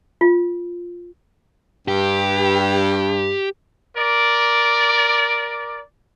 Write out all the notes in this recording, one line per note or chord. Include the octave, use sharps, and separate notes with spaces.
F4
G2 G4
A#4 D5